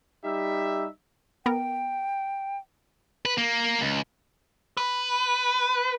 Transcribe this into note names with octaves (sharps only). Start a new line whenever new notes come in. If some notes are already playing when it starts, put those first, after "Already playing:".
G3 D#4 G4 E5
B3 A#4 G5
B4
A#3
C#2
B4